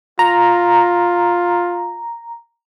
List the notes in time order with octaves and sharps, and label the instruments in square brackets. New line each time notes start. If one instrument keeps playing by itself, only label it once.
[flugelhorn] F4 [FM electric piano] A#5